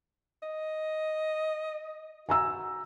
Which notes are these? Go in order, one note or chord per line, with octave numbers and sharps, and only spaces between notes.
D#5
F#4 G#5 A#5 E6